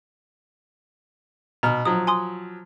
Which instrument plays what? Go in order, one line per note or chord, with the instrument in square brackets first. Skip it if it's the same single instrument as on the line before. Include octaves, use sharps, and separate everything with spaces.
[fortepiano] B2 F6 [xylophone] A#5
[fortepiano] F3 F#3 [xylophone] D#6
[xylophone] G#5 C6 D#6